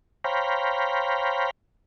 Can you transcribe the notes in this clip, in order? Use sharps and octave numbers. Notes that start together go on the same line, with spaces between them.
C5 C#5 F5 G5 A#5 B5